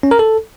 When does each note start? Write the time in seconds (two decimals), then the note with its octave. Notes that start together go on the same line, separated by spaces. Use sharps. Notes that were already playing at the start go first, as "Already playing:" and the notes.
0.03 C#4
0.11 A#4
0.19 A4